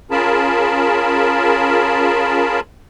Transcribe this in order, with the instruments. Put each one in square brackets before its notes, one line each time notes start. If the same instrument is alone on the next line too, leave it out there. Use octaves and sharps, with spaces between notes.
[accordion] C#4 F4 G#4 A#4 A5 B5